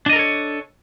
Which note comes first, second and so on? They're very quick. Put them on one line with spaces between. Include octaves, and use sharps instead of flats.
D4 D#5 A#4 A4 C#5